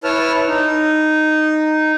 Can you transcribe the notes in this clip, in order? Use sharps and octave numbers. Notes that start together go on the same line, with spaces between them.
E4 B4 C#5 A5 F6
D#4